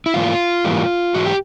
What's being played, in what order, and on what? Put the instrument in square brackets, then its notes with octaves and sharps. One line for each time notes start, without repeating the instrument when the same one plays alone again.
[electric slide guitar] E4
G#2 E3 A#3 F4
G#2 E3 G3 A#3
G#2 E3 F#4
G4